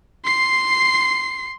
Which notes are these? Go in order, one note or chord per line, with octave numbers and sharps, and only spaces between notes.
C6 C7